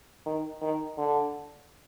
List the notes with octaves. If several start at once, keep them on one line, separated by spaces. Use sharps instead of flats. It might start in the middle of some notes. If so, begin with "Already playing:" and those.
D#3
D#3
D3